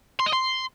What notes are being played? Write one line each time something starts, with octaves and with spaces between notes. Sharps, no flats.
C6
D#5
C6